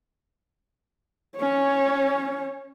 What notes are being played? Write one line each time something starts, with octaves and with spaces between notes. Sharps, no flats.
C#4 C#5